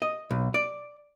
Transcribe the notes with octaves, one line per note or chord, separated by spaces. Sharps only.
D#5
B1
D5